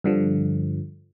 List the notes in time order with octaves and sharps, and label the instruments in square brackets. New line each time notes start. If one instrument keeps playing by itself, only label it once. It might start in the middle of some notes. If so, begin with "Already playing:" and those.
[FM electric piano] G2 D3 F3